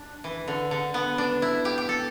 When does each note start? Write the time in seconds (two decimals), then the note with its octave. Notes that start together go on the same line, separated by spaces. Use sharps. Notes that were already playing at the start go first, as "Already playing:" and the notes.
Already playing: D4
0.24 E3
0.48 D3
0.71 D3
0.94 B3
1.18 D4
1.42 E4
1.65 G4
1.78 G4
1.89 A4